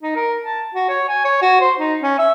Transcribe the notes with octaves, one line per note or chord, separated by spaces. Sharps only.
D#4
A#4
A5
F#4
C#5
G#5
C#5
F#4
C5
D#4
C#4
E5